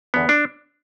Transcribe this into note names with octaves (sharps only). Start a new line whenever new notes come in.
E2 D3 B3
D4